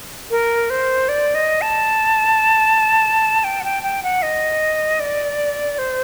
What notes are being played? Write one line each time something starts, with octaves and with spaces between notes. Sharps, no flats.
A#4
C5
D5
D#5
A5
G5
F#5
G5
G5
F#5
D#5
D5
C5